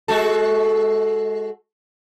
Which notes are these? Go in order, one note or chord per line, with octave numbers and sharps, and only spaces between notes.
G#3 F#4 A4